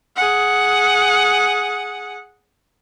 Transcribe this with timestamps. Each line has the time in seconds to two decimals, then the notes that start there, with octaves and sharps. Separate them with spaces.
0.16 G#4 F#5